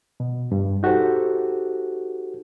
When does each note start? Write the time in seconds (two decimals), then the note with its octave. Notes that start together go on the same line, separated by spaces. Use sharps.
0.20 B2
0.52 G2
0.83 D#4 F#4 G4 A4 C5